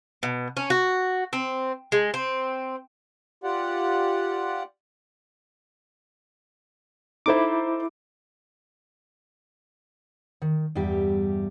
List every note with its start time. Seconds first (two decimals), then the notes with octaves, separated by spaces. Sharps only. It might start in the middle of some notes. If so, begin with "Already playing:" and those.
0.23 B2
0.57 C#4
0.70 F#4
1.33 C4
1.92 G#3
2.14 C4
3.44 F4 G4 D5 F#5
7.26 D#4 E4 A4 C5 D6
10.42 D#3
10.75 E2 G2 G3 G4 E5